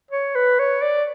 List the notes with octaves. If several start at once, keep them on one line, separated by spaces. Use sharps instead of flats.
C#5
B4
C#5
D5